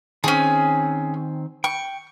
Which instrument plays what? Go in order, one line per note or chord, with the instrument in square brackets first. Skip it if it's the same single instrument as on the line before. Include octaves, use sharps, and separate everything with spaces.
[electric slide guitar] D#3 C4 [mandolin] C#4 G#4
[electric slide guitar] G5 [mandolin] C#6